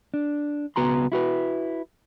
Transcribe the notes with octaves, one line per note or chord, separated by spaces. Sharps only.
D4
C#2 B3 F#4 A#5 C6
E4 F#4 B4